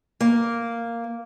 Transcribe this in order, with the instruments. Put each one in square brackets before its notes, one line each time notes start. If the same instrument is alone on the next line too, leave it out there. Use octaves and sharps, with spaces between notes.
[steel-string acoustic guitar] A#3